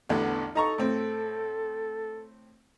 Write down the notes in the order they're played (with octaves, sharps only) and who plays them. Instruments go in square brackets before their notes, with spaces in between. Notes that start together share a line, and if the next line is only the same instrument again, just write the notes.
[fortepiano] A1 E2 D3 [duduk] B3
[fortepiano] D#4 A#5 C#6 [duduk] A4
[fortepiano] A2 C4